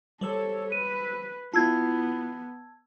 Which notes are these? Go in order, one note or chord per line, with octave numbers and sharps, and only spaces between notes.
G3 A4 C5 C#5 E6
B4 D#7
B3 E4 F4 A5 E6 G#6